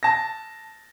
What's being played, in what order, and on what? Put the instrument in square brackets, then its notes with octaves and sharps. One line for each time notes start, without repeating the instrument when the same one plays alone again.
[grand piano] A5 A#6